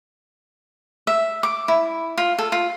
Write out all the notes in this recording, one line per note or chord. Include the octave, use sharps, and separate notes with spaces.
E5
D6
E4
F4
A4
F4